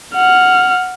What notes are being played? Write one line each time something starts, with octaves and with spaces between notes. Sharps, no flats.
F#5 F6